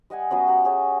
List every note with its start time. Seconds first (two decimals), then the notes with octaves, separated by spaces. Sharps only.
0.10 G3 D#5 F#5 G#5
0.30 F#3 B3 C#4 F#5
0.47 G4 F#5 A#5
0.64 G4 G#4 C#5 F#5